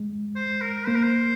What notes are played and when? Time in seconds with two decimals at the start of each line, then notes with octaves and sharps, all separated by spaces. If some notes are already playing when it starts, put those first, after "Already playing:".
Already playing: G#3
0.36 C5
0.62 A#4
0.87 A#3 C5
0.95 A#4
1.03 C5